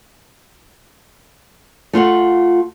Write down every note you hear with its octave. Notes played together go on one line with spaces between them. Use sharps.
A3 F4 F5 F#5